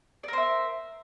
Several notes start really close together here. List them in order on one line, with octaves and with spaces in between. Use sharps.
D5 A#4 C5 E5